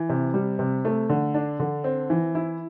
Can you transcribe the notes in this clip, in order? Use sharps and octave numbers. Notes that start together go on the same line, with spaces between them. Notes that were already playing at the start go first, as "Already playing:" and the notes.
Already playing: E3
C3
G3
C3
A3
D3
D4
D3
C4
E3
E4